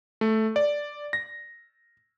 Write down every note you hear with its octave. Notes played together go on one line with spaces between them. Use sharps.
A3
D5
A#6